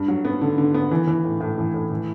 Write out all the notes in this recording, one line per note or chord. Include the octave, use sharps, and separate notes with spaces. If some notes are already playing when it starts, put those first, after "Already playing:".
Already playing: G2
F#3
B3
D3
D3
B3
E3
E3
A2
A2
E3
A2
E3